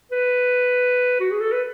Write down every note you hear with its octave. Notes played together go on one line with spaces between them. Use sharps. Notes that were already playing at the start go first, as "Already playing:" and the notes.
B4
F#4
G#4
A4
B4